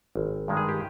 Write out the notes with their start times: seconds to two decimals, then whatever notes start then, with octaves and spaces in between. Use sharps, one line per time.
0.15 G#1
0.48 G2 D#3 G#3
0.57 G#4
0.69 G4